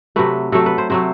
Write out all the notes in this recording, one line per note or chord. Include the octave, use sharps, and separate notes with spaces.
C3 F#3 A3 B4
C3 F#3 A3 A4
B4
C5
C3 F#3 A3 C5